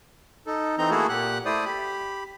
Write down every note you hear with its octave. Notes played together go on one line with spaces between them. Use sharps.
D#4 A4
E3 C4 D#4 A#5 G6
A3 A#3 E4 F#4 G#4 A4
A#2 G4 F#5 F#6
A3 E4 C5 D5 D#6
G4 B5